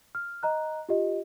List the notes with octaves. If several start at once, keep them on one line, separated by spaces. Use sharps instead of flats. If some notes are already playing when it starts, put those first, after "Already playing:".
F6
D#5 A#5 F#6
F4 G4 D#5